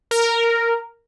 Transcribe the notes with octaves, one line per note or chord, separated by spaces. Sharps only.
A#4